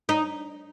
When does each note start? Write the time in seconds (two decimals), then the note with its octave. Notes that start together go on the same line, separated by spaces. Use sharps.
0.09 D#4